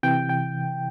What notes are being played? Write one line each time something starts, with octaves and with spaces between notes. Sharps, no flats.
C3 E3 G5
G5